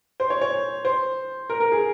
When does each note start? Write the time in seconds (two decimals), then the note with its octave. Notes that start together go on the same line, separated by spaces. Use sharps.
0.20 C5
0.30 C#5
0.42 C#5
0.85 C5
1.50 A#4
1.60 A#4
1.72 G#4